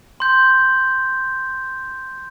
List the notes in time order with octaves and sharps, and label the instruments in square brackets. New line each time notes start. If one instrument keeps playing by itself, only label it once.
[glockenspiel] C6 G6